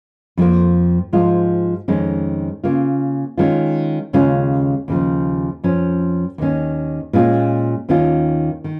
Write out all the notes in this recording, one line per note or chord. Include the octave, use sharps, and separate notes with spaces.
F2 F3 A#3
G#2 F3 G#3 F4
F2 D#3 G#3 C#4
C#3 A#3 F4
D#3 G#3 C#4 F4
D#2 C#3 G#3 C#4 F4
D#2 C#3 F3
F2 F3 C#4
D#2 D#3 C#4
A#2 G#3 C#4 F4
D#2 D#3 C#4 F4
D#3